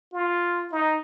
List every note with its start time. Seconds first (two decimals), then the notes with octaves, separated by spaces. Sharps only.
0.13 F4
0.72 D#4